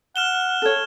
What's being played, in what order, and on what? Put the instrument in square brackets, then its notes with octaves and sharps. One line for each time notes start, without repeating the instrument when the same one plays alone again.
[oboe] F#5 [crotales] F6 E7 G7
[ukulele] A4 C#5